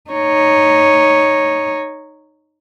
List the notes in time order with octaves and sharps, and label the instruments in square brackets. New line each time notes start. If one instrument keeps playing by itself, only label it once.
[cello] D#4 C#5